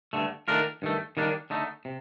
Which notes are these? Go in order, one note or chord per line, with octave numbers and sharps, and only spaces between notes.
G2 D3 A3
D#3 A3 D4 F4 A#4
G2 D#3 A3
D#3 G3 A#3 D4
D3 A3 D#4
C3